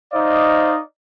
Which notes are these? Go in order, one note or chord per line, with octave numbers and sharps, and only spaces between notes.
D#4 C5 D5 D#5 F5